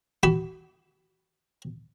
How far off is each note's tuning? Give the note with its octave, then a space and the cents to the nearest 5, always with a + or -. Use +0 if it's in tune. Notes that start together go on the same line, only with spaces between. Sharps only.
F#4 +35 B5 +0